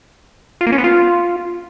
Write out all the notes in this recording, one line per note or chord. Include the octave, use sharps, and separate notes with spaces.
F4
A#3
C#4
B3
F4